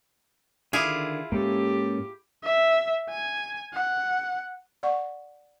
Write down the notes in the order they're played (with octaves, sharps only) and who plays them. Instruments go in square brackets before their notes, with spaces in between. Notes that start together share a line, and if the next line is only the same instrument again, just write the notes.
[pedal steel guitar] D3 D#3 D6 [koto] E4 F4 G#4
[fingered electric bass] G#2 [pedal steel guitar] A#3 C#4 A4 [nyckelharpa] G4
[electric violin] E5
G#5
F#5
[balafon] D5 F#5 C#6